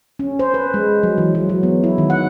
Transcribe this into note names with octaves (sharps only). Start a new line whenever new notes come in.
C#4
C5
B4
G#3
F#3
E3
F#3
F#3
B3
E4
D#3
F#5